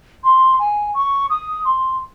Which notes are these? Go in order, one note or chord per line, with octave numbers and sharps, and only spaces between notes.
C6
G#5
C#6
D#6
C6